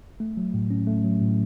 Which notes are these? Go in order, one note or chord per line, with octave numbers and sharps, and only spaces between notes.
A3
F#3
A2
C#4
A3
F#3
A2